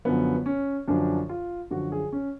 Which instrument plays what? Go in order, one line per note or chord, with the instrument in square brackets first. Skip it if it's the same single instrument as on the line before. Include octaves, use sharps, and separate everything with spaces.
[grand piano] F#2 D3 F3 B3
C#4
F#2 D3 F3 D4
F4
F#2 D3 F3 F#4
G#4
C#4